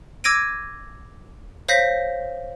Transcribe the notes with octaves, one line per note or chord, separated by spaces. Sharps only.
D6 E6 G#6 A#6 D7 D#7
C5 C#5 F5 G6 A#6 B6